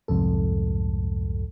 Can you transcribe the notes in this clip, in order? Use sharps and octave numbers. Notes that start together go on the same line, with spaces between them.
C2 F2 G#2 A4